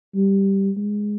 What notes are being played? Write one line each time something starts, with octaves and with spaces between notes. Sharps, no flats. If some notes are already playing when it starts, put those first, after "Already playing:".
G3
G#3